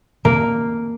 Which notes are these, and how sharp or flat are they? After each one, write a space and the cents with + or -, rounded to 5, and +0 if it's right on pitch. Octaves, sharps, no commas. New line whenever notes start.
A#3 -5